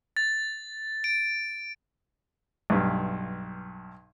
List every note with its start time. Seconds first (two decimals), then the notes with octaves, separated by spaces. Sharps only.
0.17 A6
1.04 D7
2.70 B1 G2